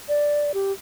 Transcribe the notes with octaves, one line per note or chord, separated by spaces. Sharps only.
D5
G4